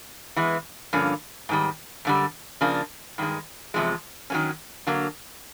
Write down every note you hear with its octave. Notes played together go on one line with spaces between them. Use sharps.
E3 G#3 B3
G2 D3 F3 A#3 C#4
G#2 D#3 G3
F#2 D3 G3
C#3 F3 A#3 D4
G2 D#3 G#3
E2 C3 F3 G#3
D#3 F#3 A#3 C#4
D3 F#3 A#3